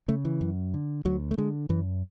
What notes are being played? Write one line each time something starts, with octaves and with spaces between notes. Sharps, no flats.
C#3 A3
E3
F#2
D3
D2 F#3
A3
D3 G#3
F#2 E3